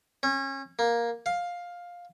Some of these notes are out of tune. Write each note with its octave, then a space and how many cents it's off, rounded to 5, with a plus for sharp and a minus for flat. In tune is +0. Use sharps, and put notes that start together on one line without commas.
C#4 -30
A#3 +10
F5 +10